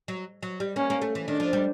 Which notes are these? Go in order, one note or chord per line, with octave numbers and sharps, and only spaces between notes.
F#3
F#3
G3
A#3 C#4
A#3
A3
E3
D#3 D4
F3
G3